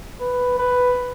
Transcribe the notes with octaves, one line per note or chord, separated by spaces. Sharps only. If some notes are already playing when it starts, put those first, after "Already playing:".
B4
B4